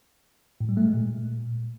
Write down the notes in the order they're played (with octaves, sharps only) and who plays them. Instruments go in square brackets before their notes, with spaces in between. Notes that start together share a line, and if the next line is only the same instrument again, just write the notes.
[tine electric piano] A2
G3
A3
G#3
A#2